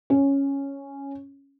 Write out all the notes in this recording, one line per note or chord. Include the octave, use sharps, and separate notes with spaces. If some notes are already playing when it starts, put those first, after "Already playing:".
C#4